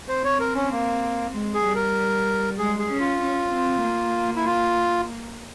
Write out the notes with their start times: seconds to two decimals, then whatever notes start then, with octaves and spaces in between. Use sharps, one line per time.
0.08 C4 C5
0.24 C#5
0.40 A#4
0.55 C#4
0.71 A#3
1.33 G#3
1.54 G#4
1.65 G3
1.75 A#4
2.58 G#3 G#4
2.79 G#4
2.90 C#4
2.99 F4
3.20 C#4
3.52 C4
3.83 A#3
4.36 E4
4.45 F4